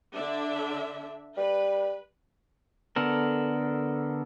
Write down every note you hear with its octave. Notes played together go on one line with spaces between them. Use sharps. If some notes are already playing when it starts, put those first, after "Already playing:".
D3 D4 E5
G3 B4
D3 B3 A4 A#4